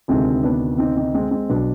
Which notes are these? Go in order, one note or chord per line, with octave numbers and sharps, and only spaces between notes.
D2 C3 D#3 G#3 C4
B3 D4
C4 D#4
C4 D#4
G#3 C4
G#3 C4
B1 B2 B3 D4